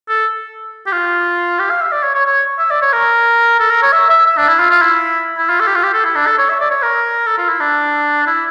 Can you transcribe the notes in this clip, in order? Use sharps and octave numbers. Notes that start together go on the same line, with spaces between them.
A4
G4
F4
G4
F5
E5
D5
C#5
C#5
C#5
E5
D5
C#5
A#4
A4
A#4
C#5
E5
E5
E5
D4
E4
F4
F4
E4
E4
F4
A4
G4
F4
G4
A4
E4
D4
A4
C#5
E5
D5
C#5
A#4
A4
F4
E4
D4
E4